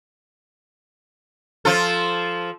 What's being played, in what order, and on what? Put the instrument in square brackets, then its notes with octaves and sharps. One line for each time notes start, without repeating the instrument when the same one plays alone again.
[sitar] F3 F4 A4